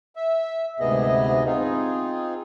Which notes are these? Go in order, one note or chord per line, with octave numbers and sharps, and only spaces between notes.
E5
D2 G#2 C3 B3 G#4 D#5
C4 D#4 F4 G#4